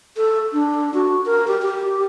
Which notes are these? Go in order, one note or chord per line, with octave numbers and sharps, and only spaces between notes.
A4
D4
F#4
A#4
G4
G4